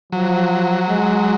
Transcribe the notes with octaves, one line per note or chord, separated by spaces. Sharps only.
F3 F#3
G#3